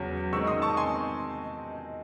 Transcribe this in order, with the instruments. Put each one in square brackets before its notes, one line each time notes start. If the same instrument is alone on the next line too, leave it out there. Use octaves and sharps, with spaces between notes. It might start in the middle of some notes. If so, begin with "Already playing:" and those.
Already playing: [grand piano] E2 C#3 F#3 C#4
D#3 G#3 C4 D#4 C#6 E6
C6 D#6
A5 C#6
G#5 C6